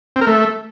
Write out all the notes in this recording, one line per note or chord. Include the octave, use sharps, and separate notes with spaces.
C4
A#4
A3